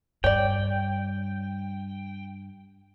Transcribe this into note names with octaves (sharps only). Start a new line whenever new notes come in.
G2 C#5 D5 G5